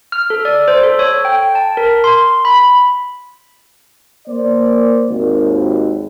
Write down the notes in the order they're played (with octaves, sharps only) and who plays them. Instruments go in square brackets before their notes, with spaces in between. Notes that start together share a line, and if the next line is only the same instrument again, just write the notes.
[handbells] F6
A4
D5
C5
A4
C#5
G5
A5
A#4
C6
B5
[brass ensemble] A#3 C5 D5
G#1 D#2